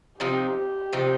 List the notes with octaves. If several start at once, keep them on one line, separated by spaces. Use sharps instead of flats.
C3 F3 C4 D#4 G4
C3 F3 C4 D#4